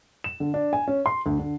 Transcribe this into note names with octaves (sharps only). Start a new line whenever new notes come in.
E7
D3
D4
G#5
C#4
C6
D2
D3